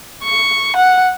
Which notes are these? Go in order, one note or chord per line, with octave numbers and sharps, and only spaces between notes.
C#6
F#5